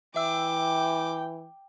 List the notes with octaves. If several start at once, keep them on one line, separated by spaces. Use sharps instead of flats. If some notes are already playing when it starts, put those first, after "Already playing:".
E3 E5 G5 D6 E6